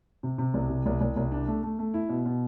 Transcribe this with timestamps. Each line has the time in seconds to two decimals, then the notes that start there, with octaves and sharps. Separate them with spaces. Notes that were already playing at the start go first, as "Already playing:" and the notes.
0.23 C3
0.38 C3
0.54 C2
0.70 C3
0.86 C2
1.01 C2
1.17 C2
1.32 D4
1.48 A3
1.63 A3
1.79 A3
1.94 E4
2.09 B2
2.26 B2